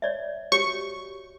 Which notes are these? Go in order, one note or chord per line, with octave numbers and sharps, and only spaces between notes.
C#5 D5 E5
F#4 G4 C#5 C#6